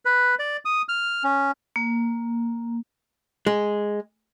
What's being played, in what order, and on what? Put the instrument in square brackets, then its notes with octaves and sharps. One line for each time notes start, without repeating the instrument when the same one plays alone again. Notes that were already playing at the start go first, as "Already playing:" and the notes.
[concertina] B4
D5
D#6
F6
C#4
[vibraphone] A#3
[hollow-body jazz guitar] G#3